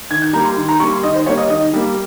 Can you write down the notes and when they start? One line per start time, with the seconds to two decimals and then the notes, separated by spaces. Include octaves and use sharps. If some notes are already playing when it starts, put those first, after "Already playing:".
0.10 D#3 G#6
0.22 G6
0.33 G3 A#3 A#5
0.45 C6
0.57 D#3 C6
0.69 A#5
0.80 G3 A#3 C#6
0.92 C6
1.03 D#3 D#5
1.14 C5
1.26 G3 A#3 C#5
1.38 D#5
1.50 D#3 D#5
1.73 G3 A#3